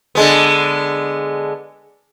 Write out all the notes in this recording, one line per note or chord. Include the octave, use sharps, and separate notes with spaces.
D3 G#3 B3